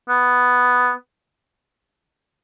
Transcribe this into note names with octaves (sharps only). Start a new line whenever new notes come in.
B3